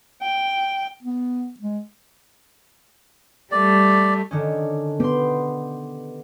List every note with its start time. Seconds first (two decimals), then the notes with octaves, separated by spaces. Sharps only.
0.22 G5
1.03 B3
1.60 G#3
3.51 G3 A3 D5
4.31 D3 D#3 C#4
5.00 B3 G4 C6